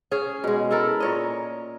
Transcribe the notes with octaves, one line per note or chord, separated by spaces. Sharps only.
C#4 G#4
B2 G#3
E4 A4 A#4
A#2 C#5 D#5